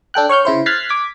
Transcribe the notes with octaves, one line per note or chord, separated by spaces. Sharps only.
D4 A4 G5 F#6
C#5 C#6 F6 G6
C#3 E4 C5
F6 F#6 G#6 A6 B6 C7
D6 G#6 B6